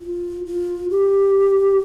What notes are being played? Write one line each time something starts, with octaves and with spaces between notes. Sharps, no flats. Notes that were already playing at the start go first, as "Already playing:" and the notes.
F4
F4
G4